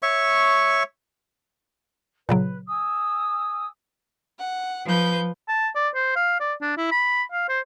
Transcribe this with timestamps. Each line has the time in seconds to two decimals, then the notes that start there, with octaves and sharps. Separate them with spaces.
0.02 C#5 E5 C#6
2.29 A#2 C#3 F#3 B4
2.67 G#5 D#6 E6
4.38 F#5
4.85 F3 B4 G6
5.48 A5
5.75 D5
5.95 C5
6.16 F5
6.40 D5
6.62 D4
6.77 E4
6.92 B5
7.32 F5
7.49 C5